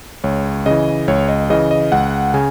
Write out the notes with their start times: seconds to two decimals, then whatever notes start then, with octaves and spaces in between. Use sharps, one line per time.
0.24 C#2 C#5
0.66 C#3 E3 D#5
1.08 C#2 C#5
1.29 D#5
1.50 C#3 E3 D#5
1.71 D#5
1.92 C#2 F#5
2.34 C#3 G#5